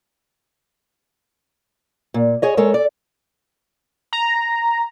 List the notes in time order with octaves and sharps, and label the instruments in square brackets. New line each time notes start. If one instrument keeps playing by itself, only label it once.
[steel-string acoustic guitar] A#2
G#4 C#5 D#5
G#3 A4 A#4 C#5
D5
[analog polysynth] A#5